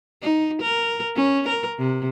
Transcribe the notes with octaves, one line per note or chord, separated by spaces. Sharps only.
D#4
A#4
C#4
A#4
C3